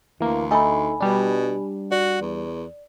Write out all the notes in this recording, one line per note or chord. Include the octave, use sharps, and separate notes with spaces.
D2 E3 A#3
A3 D#4 A4 G#5 B5
B2 G3 D4
F#4 D5
E2